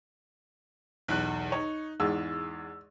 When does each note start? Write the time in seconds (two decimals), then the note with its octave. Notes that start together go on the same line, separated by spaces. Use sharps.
1.08 B1 E2 F#6
1.52 D#4 C#5
2.00 E2 G#2 E6